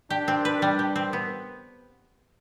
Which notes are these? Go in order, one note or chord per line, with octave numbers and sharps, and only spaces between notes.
D4 G4
C4
B4
G3
G4
C4
B3